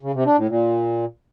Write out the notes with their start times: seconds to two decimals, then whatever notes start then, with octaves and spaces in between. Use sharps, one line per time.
0.03 C#3
0.14 C3
0.26 D4
0.37 A2
0.49 A#2